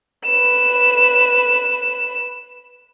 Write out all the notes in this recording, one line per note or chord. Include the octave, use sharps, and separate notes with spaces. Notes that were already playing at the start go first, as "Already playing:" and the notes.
B4 E7